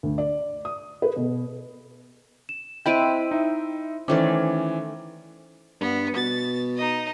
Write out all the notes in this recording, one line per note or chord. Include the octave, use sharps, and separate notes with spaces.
D2
D5
D#6
B4
B2
E7
C4 E4 B4 D#5 G5 D7 D#7
D#4 E5
D#3 E3 A3 C#4 C5 D5 D6
G2 B3
B2 A6
D#4 D#5